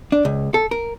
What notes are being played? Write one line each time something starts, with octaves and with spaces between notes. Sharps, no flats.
D4
C#2
A4
A#4